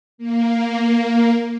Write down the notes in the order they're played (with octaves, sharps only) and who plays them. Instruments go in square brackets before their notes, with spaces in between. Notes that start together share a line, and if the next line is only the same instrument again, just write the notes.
[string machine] A#3